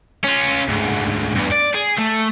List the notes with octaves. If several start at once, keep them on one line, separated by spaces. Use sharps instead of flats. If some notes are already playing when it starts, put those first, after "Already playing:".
C#4 F4
D2 G#2
E2 G2
D5
G#4
A3